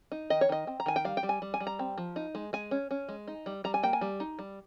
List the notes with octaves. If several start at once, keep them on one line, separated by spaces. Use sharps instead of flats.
D#4
D#3 D#5
C#5
D#3 D#5
C4
A#5
D#3 G#5
G5
G3 F5
G5
G3
G#5
G3
G#5
G3
A#5
C4
F3
D#4
G#3
G#3 G#5
C#4
C#4
G#3
D#4
G3
G3 A#5
G#5
A#3 G5
G#5
G3
D#4
G3